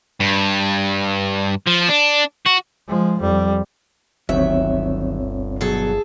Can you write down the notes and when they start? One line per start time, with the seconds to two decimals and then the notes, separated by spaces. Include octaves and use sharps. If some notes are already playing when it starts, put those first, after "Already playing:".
0.20 G2
1.67 F3
1.90 D4
2.46 F#4
2.87 F3 G#3
3.19 F2 G3
4.29 G1 D2 D#3 F#3 C4 C#5 E5
5.61 B2 F#3 G#4 A4